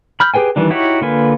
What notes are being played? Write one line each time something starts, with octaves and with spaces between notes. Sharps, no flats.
B5 F6 G6
G4 G#4 B4 G5 G#5
D#3 E3 G3 D4
D#4 E4 F#4 G4 C#5
D3 A#3 F4 B4 G#5